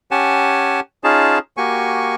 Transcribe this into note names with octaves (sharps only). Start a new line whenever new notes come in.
C#4 G4 F#5 G#5 A5
C#4 D#4 F4 G#4 A5
A#3 F#4 G4 G#5 C#6